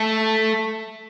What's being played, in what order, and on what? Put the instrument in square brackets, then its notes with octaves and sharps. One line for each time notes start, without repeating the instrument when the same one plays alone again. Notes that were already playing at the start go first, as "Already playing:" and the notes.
Already playing: [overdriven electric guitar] A3